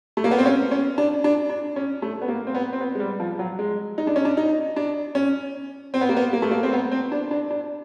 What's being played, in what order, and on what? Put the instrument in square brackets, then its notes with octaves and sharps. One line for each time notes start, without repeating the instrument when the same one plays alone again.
[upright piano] A3
A#3
B3
C4
C#4
C#4
D4
D4
D4
C#4
A3
B3
A#3
C4
B3
C4
B3
G#3
G3
F3
F#3
G#3
D#4
D4
C#4
D4
D#4
D4
C#4
C4
B3
A#3
B3
A#3
A3
A#3
C4
B3
C4
D4
D4
D4